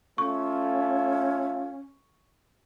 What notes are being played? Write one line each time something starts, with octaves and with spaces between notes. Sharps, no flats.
A3 C#4 F4 C#6